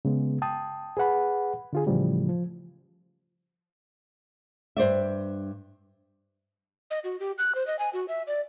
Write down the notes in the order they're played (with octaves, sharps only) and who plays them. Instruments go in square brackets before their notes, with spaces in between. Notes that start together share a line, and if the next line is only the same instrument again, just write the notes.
[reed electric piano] C#3 G#3 B3
G5 A5 D#6
G#4 B4 F#5 B5
D3 F4 G#4
A2 C#3 E3 F3 G3 A3
F3
[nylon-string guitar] G2 C5 D5 E5
[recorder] D#5
F#4
G4
F#6
C5
D#5
G#5
F#4
E5
D5